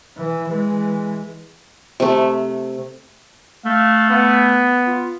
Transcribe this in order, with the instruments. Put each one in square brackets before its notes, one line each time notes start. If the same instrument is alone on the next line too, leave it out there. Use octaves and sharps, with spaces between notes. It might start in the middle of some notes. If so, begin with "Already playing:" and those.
[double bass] E3
E3 G#3
[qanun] C3 A3
[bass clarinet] A3 [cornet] F5
[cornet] B3
[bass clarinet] F4